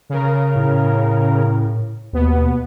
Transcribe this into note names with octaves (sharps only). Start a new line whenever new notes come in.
C#3 A#4
A2
D#2 B2 B3